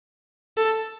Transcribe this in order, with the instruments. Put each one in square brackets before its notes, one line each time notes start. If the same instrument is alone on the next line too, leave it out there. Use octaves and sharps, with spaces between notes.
[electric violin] A4